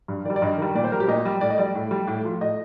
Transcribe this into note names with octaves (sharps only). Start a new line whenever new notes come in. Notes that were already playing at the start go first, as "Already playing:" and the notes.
G2
D#3 G3 D5
D5
G2 D#5
D#3 G3
A#2 D5
C5
G3 A#4
G4
A#2 D#5
G3
A2 D5
D#5
G3 D5
A2
G3
A2
F3
A2 D#5